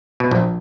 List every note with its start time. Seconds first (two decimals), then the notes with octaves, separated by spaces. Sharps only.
0.20 B2
0.31 A#1 A#2